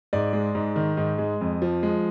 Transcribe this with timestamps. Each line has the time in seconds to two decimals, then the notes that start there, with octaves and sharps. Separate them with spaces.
0.13 G#2 D5
0.33 G#3
0.55 G#2
0.76 D#3
0.97 G#2
1.18 G#3
1.41 F2
1.62 F3
1.83 G#3